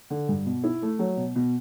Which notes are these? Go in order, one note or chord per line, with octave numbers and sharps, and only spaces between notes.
D3
G2
B2
E4
A3
F#3
B2
B2